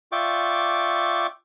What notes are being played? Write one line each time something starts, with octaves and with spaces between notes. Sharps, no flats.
F4 D5 E5 G5 C#6 D6